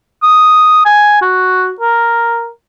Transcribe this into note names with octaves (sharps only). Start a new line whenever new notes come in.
D#6
G#5
F#4
A#4